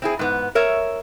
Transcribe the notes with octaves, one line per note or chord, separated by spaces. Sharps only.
C4 E4 G#4
G#2 B3
A#4 C#5 E5